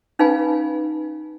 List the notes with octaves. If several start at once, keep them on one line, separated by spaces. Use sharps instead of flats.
C#4 D#4 B4 F5 G#5 B5